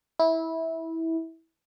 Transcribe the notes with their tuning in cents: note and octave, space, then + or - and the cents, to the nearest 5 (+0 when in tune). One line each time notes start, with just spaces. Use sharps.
E4 -20